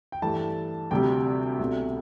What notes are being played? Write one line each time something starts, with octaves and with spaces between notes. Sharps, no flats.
G5
G2 E3 A3 A5
D2 C3 G3 G5
C2 B2 A3 E5